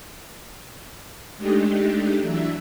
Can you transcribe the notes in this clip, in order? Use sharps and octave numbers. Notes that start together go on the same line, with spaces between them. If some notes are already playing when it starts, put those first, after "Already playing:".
G#3 A3 D4 D#4 G4
E3 F#3 D4 E5